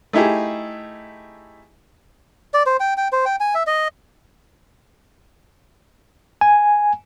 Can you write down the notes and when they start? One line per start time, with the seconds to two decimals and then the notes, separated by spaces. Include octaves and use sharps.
0.13 A3 D#4 E4 G4 G#4
2.54 D5
2.66 C5
2.80 G5
2.97 G5
3.13 C5
3.26 G5
3.40 G#5
3.55 E5
3.67 D#5
6.41 G#5